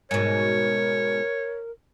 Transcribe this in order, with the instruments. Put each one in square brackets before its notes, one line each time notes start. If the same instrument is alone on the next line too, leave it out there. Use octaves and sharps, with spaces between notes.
[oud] G#2 B2 [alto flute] A#4 [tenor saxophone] C#5